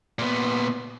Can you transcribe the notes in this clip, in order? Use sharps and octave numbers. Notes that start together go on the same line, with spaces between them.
A#2 B3